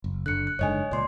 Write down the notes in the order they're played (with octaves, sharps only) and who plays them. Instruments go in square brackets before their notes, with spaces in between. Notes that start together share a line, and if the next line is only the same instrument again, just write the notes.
[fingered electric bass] F#1
[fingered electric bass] F#1 D3 [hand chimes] F#6 C#7
[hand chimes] F#6
[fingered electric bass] F#1 G#2 D3 [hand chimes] C#5 D#5 G#5
[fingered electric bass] C#2 A#2 [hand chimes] D5 C6